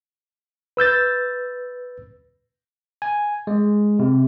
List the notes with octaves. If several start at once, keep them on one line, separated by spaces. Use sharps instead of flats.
B4 E6 G6 A6
G#5
G#3
C3